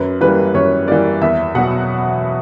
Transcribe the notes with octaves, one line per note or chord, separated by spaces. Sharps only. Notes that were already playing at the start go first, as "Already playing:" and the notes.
Already playing: F#2 B4
E3 G3 A#3 B4
F#2 C#5
E3 G3 A#3 D5
E2 E5
B2 F#3 F#5